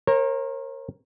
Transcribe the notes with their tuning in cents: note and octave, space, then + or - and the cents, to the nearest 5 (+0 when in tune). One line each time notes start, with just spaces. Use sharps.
A#4 +0 C#5 -45